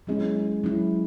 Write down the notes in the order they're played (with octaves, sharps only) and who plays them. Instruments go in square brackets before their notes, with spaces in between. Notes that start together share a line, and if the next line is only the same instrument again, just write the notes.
[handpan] F#3 C#4 E4 [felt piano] G#3
[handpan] F#3 C#4 E4